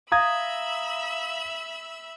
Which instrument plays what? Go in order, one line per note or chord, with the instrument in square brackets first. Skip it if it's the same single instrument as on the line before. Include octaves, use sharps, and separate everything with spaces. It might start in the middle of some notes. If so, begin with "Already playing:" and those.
[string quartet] E5 B5 E6 [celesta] F5 [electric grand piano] A#5 D#6 G#6